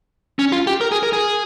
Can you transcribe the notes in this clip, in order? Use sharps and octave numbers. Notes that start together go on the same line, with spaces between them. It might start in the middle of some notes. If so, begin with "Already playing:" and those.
C#4
F4
G4
A#4
G#4
A#4
G#4